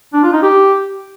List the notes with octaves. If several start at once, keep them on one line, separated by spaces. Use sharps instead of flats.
D4
F4
D#4
G4